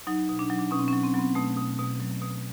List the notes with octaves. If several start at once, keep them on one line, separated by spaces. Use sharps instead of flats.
F#3 D#4
B2
D4
F#3 D#4
D4
B2 C#4
C4
C#4
F#3
C4
F#3 B3
C4
B2 A3
B2
B2
F#3
B2